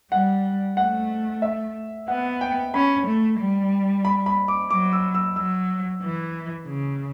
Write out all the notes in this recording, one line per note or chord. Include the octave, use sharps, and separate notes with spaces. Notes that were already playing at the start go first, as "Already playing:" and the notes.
G3 F#5
A3 F#5
E5
B3 F#5
G5
C#4 B5
A3
G3
B5
B5
D6
F#3 D6
E6
E6
F#3 E6
E3
C#3